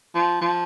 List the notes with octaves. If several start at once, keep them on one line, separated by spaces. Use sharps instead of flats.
F3
F3